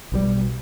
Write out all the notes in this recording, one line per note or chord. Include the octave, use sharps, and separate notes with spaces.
B1 B2 G3